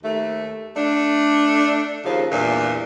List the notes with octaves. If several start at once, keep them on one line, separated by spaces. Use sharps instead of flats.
D#2 A3
A3 D4
D#2 C#3 F3
E2 G2 A#2